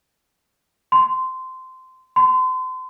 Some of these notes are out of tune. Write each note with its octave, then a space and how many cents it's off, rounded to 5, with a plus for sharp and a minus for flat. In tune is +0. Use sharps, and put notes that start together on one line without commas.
C6 -15
C6 -35